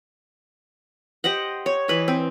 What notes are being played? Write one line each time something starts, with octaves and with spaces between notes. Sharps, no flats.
G4 C5 D#5 F#5
C#5
E3 B4 D#5
C4